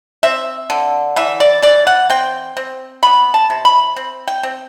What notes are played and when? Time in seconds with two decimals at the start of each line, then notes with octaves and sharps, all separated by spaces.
0.23 C4 E5
0.70 D3
1.16 E3 E5
1.40 D5
1.62 E3 D5
1.87 F#5
2.10 C4 G5
2.57 C4
3.03 B3 B5
3.34 A5
3.50 C3
3.65 B5
3.96 C4
4.28 G5
4.43 C4